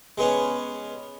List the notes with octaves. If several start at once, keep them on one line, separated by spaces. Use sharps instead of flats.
G#3 B3 C#4